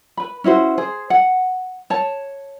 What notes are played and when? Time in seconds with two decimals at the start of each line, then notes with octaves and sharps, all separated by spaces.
0.17 B4 B5
0.44 C#4 E4 F#4 C5
0.78 G#4 C5
1.10 F#5
1.90 C#5 A5